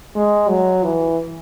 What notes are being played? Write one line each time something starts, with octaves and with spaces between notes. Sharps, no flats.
G#3
F#3
E3